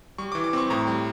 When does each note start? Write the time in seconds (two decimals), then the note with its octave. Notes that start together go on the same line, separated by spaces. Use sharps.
0.18 G3 C#6
0.32 E3 D6
0.44 D6
0.53 C4 C#6
0.70 A2 A#5
0.87 G3